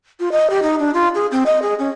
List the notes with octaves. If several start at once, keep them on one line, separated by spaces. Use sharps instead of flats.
F4
D#5
G4
D#4
D4
F4
G#4
C4
D#5
G#4
C#4